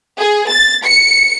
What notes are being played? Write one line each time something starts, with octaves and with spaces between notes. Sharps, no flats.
G#4
A6
C#7